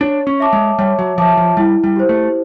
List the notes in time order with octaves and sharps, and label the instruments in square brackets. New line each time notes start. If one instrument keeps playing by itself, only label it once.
[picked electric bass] D4 [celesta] C#5
[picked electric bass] C#4
[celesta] E5 A5 D6
[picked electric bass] G#3
[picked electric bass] G3 [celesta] C#5
[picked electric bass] F#3
[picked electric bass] F3 [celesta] E5 A5 D6
[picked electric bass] F3
[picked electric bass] G3 [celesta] E4
[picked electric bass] G3
[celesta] G4 C5
[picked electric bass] A3